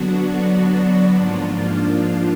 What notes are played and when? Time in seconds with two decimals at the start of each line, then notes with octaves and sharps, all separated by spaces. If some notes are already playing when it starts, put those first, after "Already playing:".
Already playing: D3 F#3 B3 D4 F#4
1.11 G#2 F3 A#3 D4 F4